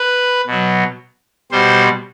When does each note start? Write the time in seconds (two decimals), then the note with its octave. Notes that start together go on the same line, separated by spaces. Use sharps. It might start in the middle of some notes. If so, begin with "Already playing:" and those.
Already playing: B4
0.46 B2 F#3
1.51 B2 G3 C5